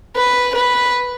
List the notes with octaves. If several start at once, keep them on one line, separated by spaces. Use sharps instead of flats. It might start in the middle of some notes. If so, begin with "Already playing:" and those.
B4
B4